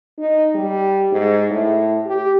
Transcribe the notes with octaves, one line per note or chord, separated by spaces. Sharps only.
D#4
G3
G#2
A2
G4